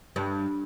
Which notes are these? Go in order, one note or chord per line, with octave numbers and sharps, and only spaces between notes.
G2